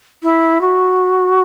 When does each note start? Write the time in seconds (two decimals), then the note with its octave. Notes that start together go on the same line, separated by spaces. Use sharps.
0.23 E4
0.61 F#4